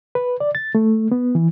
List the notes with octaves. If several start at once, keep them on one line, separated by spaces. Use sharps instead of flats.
B4
D5
A6
A3
B3
E3